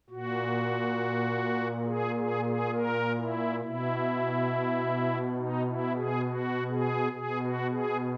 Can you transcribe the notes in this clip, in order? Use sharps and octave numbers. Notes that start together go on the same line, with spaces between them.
A#2 F#4
G#4
G#4
G#4
A#4
E4
B2 E4
D#4
E4
G#4
F#4
G#4
B2 G#4
F#4
G#4